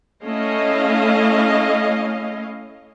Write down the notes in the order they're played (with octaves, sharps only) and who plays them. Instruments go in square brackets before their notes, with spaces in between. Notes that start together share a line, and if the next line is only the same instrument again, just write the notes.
[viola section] A3 C#4 E4 D#5 F5